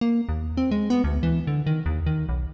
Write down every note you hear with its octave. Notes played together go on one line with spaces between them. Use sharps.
A#3
D#2
C4
G#3
B3
D2
E3
D3
D#3
D#2
D#3
B1